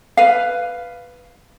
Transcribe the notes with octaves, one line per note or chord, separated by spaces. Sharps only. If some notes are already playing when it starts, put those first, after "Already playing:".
B4 F5